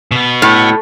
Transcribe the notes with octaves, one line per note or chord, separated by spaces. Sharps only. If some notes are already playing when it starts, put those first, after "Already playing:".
B2 B3
A2